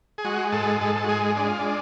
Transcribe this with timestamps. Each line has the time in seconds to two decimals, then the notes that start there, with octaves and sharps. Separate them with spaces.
0.18 G#4
0.24 G#3 F#4
0.52 G#2 A4
0.81 G#2 A4
0.95 A4
1.04 F#4
1.08 G#3 G#4
1.37 G#3 D4
1.48 F4
1.59 D4